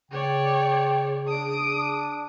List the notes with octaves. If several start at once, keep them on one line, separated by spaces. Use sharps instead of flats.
C#3 C#5 D5 G5
D4 D#6 D7